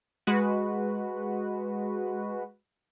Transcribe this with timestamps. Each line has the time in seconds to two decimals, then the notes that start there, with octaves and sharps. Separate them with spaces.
0.27 G#3 F#4 B4